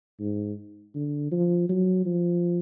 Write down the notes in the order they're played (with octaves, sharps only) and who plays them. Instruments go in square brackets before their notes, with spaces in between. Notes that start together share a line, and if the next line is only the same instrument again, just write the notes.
[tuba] G#2
D3
F3
F#3
F3